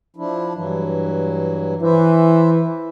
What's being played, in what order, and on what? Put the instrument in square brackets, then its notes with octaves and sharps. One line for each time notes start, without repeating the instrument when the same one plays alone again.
[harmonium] F3 D4 E4
G2 E3 F#3
[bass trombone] E3 [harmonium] B4 C5 E5